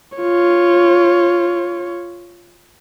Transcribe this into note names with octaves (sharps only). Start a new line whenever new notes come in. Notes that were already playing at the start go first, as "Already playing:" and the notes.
F4 C#5